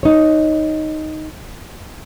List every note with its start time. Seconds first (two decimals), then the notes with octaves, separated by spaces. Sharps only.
0.03 D#4 C#5